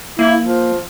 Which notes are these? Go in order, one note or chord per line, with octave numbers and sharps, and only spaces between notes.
A#3 E4
F3